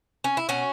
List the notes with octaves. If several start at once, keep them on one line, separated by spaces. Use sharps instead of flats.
C#4
E4
B2 C#4 F#4